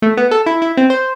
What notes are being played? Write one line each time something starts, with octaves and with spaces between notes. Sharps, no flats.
A3
B3
A4
E4
E4
C4
C5